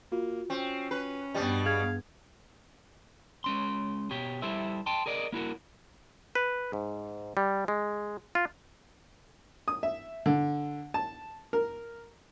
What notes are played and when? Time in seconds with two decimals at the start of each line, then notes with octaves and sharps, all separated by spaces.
0.12 A#3 F4 F#4
0.50 C4 C#4
0.91 C#4 B4
1.34 G2 B2 G3 B3
1.66 G#4 F5 G#6
3.44 G#3 C#4 C6
4.11 B2 G4 C#5
4.42 G3 E4 G4 A4 C5 E5
4.86 G5 A5 C6
5.06 G#4 A#4 D5 D#5
5.32 A#3 E4 F#4 A#4
6.35 B4
6.73 G#2
7.37 G3
7.68 G#3
8.35 F4
9.68 D#6
9.83 E5
10.26 D3
10.94 A5
11.53 A#4